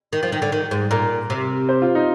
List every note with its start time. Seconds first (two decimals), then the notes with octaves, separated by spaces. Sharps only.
0.13 D#3
0.23 F3
0.32 D#3
0.42 D3
0.52 D#3
0.71 G#2
0.91 A#2 A#4
1.30 C3
1.69 C5
1.82 F4
1.95 D#4